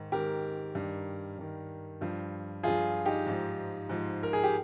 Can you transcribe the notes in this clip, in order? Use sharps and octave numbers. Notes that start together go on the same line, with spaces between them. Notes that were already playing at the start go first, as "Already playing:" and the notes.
Already playing: G#2 D#3
G#2 D#3 G4 A#4
G2 D#3
G2 D#3
G2 F3
G2 F3 F4 G#4
D#4 G4
G#2 F3
G#2 F3
A#4
G#4
G4